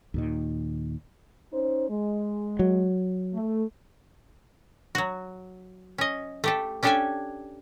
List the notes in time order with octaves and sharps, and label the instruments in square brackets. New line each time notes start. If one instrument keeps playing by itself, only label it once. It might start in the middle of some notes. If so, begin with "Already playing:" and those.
[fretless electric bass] D#2 A#2 D#3
[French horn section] C#4 D#4 C5
G#3
[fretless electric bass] F#3
[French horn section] A3
[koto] F#3 F#4
C#4 D#5
A3 G4 A4
C#4 D4 G4 A4 G5 G#5